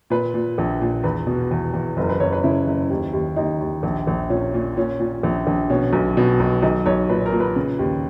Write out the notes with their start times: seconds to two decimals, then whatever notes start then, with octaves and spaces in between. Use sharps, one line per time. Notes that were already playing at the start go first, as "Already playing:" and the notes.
0.10 A#2 B4
0.34 A#2
0.58 A#1
0.81 A#2
1.04 E2 B4
1.27 B2
1.51 E2
1.73 E2
1.97 F#1 A#4
2.09 B4
2.20 F#1 C#5
2.33 B4
2.44 C#3 E4
2.67 F#1
2.90 D#2
3.13 D#2
3.36 D#2 D#4
3.60 D#2
3.83 A#1
4.07 A#1
4.30 A#2 C#4
4.54 A#2
4.77 A#2 C#4
5.00 A#2
5.23 A#1
5.47 A#1
5.70 B2 C#4
5.93 B1
6.17 B2
6.40 B1
6.62 B1 D#4
6.86 B1 C#5
7.09 A#2 B4
7.26 A#4
7.32 A#2
7.40 B4
7.56 C#3
7.79 D#2